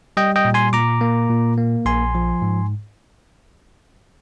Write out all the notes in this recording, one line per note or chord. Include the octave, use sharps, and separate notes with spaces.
G3 D#5 G5
D#5 G5
A#2
G#5 C6
A#2 A#5 D6
A#3
A#2
A#3
A#1 G#5 C6
F3
G#2